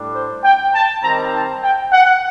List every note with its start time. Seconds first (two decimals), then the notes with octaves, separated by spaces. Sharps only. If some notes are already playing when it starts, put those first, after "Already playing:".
Already playing: A2 G3 D4
0.15 C5
0.44 G5
0.75 A5
1.03 D#3 G3 C4 D#4 A#5
1.33 A5
1.62 G5
1.92 F#5